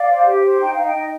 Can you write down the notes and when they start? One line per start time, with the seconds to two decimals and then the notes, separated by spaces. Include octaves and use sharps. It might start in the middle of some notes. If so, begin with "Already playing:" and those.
Already playing: D5 F5
0.09 C5
0.27 G4
0.44 C5
0.61 D#4 G5
0.74 D#4 F5
0.86 D#5 G5
0.95 D#4